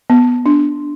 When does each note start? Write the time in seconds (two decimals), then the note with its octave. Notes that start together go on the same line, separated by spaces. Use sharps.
0.10 B3
0.46 D4